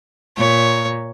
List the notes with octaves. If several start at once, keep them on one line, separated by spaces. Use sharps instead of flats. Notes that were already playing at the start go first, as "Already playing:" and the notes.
A#2 C#5